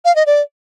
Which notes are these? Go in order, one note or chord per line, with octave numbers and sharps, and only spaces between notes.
F5
D#5
D5